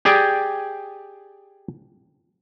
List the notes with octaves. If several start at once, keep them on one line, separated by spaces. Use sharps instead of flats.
G4 G#4 D5 G5 G#5